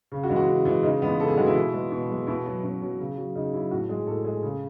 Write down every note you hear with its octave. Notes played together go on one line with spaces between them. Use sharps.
C#3
F#4
E3 G#3
F#4
C#3
E3 G#3
C#3 D#4
E3 G#3 B3
C#3 A4
G#4
E3 G#3 F#4
E4
B2
G#3
B2
G#3
B2 E4
F#3
B2 C#4
F#3
C#3
F#3
C#3 D#4
F#3 E4
A2 F#4
G#3 G#4
A2 A4
G#3 G#4
C#3 G#4